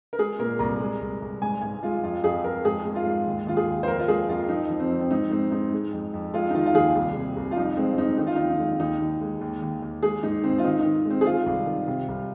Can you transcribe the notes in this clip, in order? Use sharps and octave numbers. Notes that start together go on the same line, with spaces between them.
A#4
G#3 G#4
A#2 A#4
C2 A#5
G#3
C2
C2
G#2 G#5
G#2 G#5
G#3 F4
F2 F4
F2 G#4
F2 A#4
G#2 G#4
G#2
F4
G#2
D#2
D#2 F4
G#4
D#2
C5
F2 A#4
F4
G#3 G#4
F2 F4
F2 D#4
F3
C4
F2
C4
G#2 D#4
G#2 C4
G#2 D#4
G#3
F2
F2
G#3 F4
D#4
D#3 F4
F4
D#2 G#4
C2
C3
C2
F4
F2 D#4
G#3 C4
F2 D#4
D#3 D#4
F4
D#2 D#4
D#4
G#3
D#2 D#4
D#2
G#3
D#2
D#2
D#2
G#3 G#4
G#2 D#4
D#3 C4
F4
D#3 D#4
D#4
D#3
G#3
C4
G#4
D#3 F4
C2
D#3
C3
C2